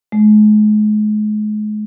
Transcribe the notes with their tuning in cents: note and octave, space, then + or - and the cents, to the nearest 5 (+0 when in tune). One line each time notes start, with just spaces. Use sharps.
G#3 +35